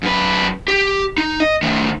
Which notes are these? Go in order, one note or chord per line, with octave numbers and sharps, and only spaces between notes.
F#2 B4
G4
D#4
D#5
D#3 A3